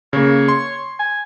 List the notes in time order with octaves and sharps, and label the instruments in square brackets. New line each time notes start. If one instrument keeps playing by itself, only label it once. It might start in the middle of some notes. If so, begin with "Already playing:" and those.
[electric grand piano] C#3 A#3 [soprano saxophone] C#5
[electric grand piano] C6
[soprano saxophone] G#5